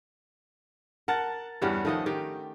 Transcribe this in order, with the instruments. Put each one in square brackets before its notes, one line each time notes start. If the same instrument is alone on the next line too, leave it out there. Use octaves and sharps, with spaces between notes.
[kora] A#4 [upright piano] F#5 A5 A6
[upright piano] E2 G2 E3 [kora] G3 C#4 F#4
[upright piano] D#3 F3 [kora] A3 D#5 F#5
[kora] D#3 [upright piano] G4